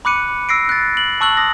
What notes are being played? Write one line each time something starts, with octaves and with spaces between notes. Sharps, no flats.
B5 D6 F#6 C#7 D#7
E6 A#6 C7 D7
F#6 A6
F#7
A5 C#6 E6 F#6 F#7
D#6 A#6